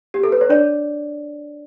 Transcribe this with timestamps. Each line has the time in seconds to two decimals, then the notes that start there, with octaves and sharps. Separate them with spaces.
0.14 G4
0.23 A4
0.32 B4
0.41 C#5
0.49 D4 D5